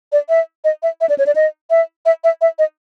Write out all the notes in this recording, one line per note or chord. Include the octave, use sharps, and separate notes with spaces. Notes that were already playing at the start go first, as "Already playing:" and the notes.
D5
E5
D#5
E5
E5
D5
C#5
D5
D#5
E5
E5
E5
E5
D#5